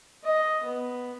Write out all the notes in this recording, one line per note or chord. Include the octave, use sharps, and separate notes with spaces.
D#5
B3